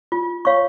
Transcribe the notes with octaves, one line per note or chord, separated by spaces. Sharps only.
F4
C#5 F5 C#6